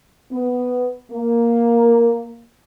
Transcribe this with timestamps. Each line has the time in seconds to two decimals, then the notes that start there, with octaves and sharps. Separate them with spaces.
0.31 B3
1.10 A#3